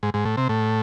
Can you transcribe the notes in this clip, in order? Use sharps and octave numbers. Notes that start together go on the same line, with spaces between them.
G#2
G#2
A2
C3
A2